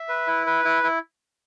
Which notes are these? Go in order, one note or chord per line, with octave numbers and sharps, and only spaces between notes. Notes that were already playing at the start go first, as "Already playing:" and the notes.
Already playing: E5
B4
E4
B4
E4
E4